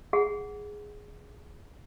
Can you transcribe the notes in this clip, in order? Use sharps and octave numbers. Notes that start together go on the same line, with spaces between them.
G#4 F#5